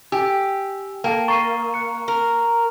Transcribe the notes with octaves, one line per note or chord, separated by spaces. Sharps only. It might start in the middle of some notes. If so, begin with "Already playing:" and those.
G4 G5 G#5 E6
A#3 A4 G5 A5
A#5 C#6 A6 C7 D#7
F#6 C#7
A#4